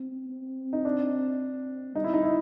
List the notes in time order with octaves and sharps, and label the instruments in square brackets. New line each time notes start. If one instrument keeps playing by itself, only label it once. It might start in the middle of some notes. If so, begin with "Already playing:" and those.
Already playing: [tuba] C4
C4
[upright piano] D#4
D4
[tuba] G3 [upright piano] D#4
[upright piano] E4
D#4
E4